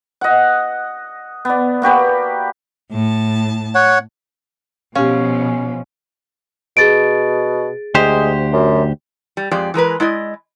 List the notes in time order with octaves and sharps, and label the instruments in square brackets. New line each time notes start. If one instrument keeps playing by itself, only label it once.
[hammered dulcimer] D#5 F#5
B3 D5
A#3 F#4 G4 B4
[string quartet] A2 A5
[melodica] C#5 F#5
[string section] B2 F3 [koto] C#4 [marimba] G4 F5
[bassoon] B2 [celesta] G#4 A6 D7
[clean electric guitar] D2 G4 C5 [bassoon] G#3
[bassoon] F#2
[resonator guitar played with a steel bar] G3
F2 G#3 G4 D5
E3 G#3 A#4 B4
G#3 E4 D5 D#5